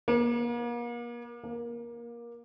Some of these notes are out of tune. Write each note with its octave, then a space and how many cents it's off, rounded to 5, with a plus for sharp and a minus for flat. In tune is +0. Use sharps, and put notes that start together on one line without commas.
A#3 +40
A#3 +20